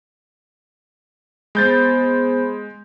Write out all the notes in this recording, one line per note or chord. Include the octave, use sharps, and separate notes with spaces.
G#3 B3 C5 B5 G6 A6